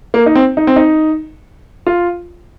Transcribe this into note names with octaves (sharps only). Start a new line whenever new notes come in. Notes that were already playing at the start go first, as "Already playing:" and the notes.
A#3
D#4
C4
D#4
C4
D#4
F4